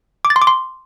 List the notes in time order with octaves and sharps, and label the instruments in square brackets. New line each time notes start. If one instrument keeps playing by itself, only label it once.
[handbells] D6
A6
C6
D6
C6